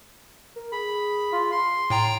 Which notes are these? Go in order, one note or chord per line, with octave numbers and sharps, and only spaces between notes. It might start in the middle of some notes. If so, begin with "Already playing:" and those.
A#4
G#4 B5
F4
C6
A2 G5 A#5 A6